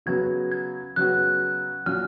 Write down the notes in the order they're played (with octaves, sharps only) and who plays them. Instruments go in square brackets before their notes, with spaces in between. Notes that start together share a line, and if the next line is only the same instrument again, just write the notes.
[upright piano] C#3 F#3 B3 F#4 [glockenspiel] G#6
[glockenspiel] G#6
[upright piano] C#3 F#3 B3 F#4 [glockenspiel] F#6
[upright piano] A#2 F#3 C#4 F#4 [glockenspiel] F6